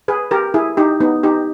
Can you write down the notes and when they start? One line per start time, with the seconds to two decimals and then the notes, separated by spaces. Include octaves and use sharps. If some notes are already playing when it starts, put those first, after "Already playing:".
0.08 G#4 B4
0.31 G4 A#4
0.54 E4 G#4
0.77 D#4 G4
1.00 B3 D#4
1.23 D#4 G4